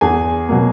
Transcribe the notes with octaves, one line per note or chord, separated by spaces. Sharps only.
E2 G#4 G#5
B2 F#3 A#3